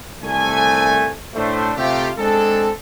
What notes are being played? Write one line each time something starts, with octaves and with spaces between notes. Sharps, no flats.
C2 A3 G#5
A2 A3 D4 C5
C3 A3 F4 G4
G#3 C4 D4 G#4 A4